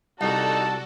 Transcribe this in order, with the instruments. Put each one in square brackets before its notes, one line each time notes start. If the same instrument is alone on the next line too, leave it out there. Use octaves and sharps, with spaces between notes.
[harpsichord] C2 [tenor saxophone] D#4 [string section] F#4 A4 D5 [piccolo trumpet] A5